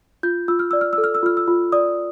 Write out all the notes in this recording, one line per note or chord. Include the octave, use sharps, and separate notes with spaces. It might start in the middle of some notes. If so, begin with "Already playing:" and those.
F4 G6
F4 E6
F6
D5 E6
F6
E6
A4
F6
E6
F4 F6
E6
F4
D5 D#6